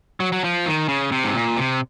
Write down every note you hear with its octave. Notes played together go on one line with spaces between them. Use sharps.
F#3
F#3
F3
D#3
C#3
C3
G#2
A#2
C3